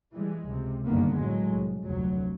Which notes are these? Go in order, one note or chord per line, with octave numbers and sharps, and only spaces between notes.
E3 G3 G#3
C#2 C3
F#1 G2 D3 D#3 A#3 B3
A2 F#3 G#3
C2
F1 D2 F#3